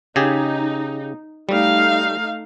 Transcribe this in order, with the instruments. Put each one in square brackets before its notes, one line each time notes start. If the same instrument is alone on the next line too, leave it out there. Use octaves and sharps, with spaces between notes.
[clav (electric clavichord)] C#3 G4 G#4 [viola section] D#4
[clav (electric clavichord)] G3 [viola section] A3 D#4 F5